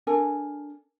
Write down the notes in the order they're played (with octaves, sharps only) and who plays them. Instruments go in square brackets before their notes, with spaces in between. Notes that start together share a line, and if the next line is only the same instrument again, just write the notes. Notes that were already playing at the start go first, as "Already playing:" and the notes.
[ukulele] D4 A4 A#4 G#5